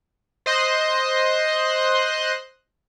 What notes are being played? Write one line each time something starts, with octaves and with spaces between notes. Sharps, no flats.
C5 D#5 C6 F#6